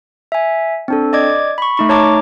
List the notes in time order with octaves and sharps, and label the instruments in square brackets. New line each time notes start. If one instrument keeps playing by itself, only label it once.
[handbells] E5 G#5
C4 D4 A4
D5 D#5 D6 G#6
B5 C#6
A3 D#4 C#6
D#4 C#5 A5 A#5 D6